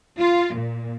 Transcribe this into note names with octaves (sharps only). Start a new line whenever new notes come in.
F4
A#2